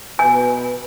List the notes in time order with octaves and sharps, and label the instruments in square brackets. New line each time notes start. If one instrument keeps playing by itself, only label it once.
[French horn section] B2 B4 [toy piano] G#5